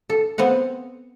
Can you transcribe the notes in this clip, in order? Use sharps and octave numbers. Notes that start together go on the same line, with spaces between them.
A4
B3 C4 F5 F#5